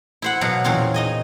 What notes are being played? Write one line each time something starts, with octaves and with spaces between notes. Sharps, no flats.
E4 C5 F#5
B2 F#3 A4 F5 F#5
E2 A#2 C#3 C4 C#4 F4
D#4 D#5 G#5